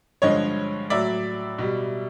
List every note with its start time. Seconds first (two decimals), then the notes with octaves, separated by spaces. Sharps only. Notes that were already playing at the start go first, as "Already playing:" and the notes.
0.22 G2 D3 F3 G#3 C#5 D#5
0.90 A2 F#3 D5 E5
1.58 B2 G3